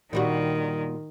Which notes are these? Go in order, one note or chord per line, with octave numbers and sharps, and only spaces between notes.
A#2 D#3 G3 F#4